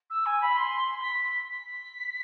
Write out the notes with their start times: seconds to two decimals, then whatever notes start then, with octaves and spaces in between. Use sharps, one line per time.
0.10 E6
0.26 G#5
0.41 B5
0.56 C6
1.02 B6
1.48 B6